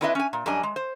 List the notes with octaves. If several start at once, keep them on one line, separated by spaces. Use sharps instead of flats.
C4 D4 E4 B4 D#5 E5
C#4 G#5
A#2
F#2 G3 D4 D#5 G#5
G#3
C5